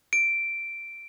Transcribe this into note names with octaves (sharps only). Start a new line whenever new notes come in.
D7